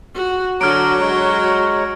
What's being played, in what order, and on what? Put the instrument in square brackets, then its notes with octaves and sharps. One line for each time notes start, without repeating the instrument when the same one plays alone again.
[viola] F#4
[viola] D3 F#4 [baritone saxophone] F#3 [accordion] C#5 A#5 D6 [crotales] F6 D7
[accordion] G#3 C#5 A#5 [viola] F#4